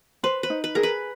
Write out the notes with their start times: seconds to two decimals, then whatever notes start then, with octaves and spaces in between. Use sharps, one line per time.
0.23 B4 C5
0.43 B4
0.50 D#4
0.64 B4
0.75 G#4 A#4
0.83 B4